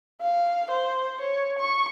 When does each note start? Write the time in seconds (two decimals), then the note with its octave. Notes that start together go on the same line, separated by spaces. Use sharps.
0.21 F5
0.71 C5
1.21 C#5
1.59 C#6